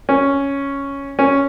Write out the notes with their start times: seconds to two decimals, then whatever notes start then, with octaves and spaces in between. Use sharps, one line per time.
0.09 C#4
1.19 C#4